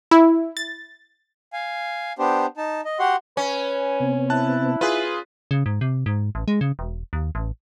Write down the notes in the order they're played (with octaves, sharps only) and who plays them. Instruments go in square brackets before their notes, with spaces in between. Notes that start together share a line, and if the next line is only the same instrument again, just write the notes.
[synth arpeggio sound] E4
A6
[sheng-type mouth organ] F5 G#5
B3 D4 G4 C5
D#4 A5
D#5
F#4 G4 F#5 C6
[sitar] C#4 [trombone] B4 [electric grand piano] G#5
[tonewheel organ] C3 B3 C4
[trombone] E4 [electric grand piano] A5 F#6
[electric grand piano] F4 G#4 [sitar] B4
[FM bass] C#3
G#2
C3
G#2
A1
G#3
C#3
E1
D#2
A1